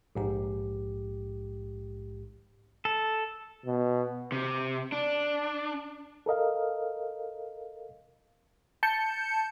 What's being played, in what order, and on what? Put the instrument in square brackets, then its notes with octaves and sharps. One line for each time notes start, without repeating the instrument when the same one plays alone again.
[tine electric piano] A#1 G#2 G4
[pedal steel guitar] A4
[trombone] B2
[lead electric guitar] C3
D4
[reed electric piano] A4 A#4 D#5 F5
[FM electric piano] A5 G6 C#7